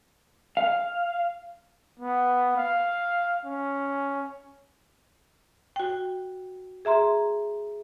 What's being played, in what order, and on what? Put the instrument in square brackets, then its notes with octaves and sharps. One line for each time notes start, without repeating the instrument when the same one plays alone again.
[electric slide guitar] F5
[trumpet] B3
F5
C#4
[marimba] F#4 G5
G#4 E5 A#5 C6